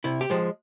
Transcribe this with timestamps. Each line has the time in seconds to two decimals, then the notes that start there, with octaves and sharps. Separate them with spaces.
0.04 C3 E4
0.21 G4
0.30 F3 G#3